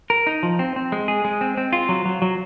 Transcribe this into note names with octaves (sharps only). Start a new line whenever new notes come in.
A#4
D#4
F3
C4
C4
G#3
G#4
G#3
C4
C4
F4
F#3
F#3
F#3